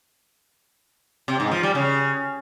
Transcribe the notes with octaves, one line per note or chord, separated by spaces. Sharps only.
C3
G#2
F3
G3
C#3